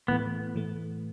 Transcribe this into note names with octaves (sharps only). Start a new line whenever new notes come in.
A2 E3 A3 B3
A2 E3 A3